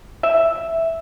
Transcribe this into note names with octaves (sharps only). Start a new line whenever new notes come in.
E5